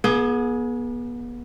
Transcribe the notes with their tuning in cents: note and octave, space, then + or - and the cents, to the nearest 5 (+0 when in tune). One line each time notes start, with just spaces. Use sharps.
B3 -35 G#4 +15